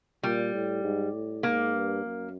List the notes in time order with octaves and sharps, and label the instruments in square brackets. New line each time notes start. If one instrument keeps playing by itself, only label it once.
[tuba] A#2 [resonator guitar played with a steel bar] G3
[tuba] A2
G#2
A2
[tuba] G#2 [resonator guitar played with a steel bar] A#3
[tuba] G2
F#2